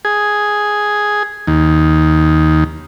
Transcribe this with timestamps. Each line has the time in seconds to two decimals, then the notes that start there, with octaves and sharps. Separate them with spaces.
0.05 G#4
1.47 D#2